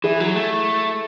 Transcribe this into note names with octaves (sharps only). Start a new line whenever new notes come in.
E3 E4 G#4
F#3
A3